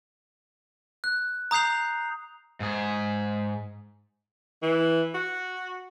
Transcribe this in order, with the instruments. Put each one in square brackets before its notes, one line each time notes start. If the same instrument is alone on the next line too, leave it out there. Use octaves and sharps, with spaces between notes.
[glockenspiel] F#6
A#5 D#6 G6 C7 F7
[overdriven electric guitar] G#2 G#4
[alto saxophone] E3
F#4